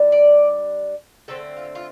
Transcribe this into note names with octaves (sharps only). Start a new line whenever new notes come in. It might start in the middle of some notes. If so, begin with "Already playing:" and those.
Already playing: G3 D4
D5
D3 A3 C4 A4
F4
F4